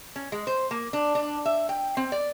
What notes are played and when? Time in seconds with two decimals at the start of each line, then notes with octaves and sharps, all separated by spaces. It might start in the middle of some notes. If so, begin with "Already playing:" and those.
0.16 C#4
0.32 G#3
0.47 C5
0.71 A#3
0.93 D4
1.15 D4
1.45 E5
1.69 G5
1.97 C4
2.12 D5